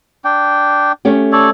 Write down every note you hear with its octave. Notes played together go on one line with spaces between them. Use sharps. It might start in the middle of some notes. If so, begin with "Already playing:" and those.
D4 G5
A3 C#4 G4
A4 C#5 D5